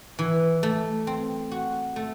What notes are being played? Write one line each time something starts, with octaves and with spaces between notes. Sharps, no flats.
E3
A3
C4
F#4
A3